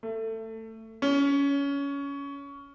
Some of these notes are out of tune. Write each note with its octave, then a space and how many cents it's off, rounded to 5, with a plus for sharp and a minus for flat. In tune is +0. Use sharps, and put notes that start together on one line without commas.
A3 +20
C#4 +20